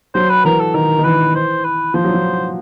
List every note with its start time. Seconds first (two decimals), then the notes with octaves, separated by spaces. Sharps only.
0.14 F#3 C5
0.29 B4
0.45 E3 A#4
0.60 A4
0.74 D#3 A#4
0.99 D#3
1.04 E3 B4
1.35 C5
1.64 B4
1.94 F3 C5
2.04 F#3
2.14 F3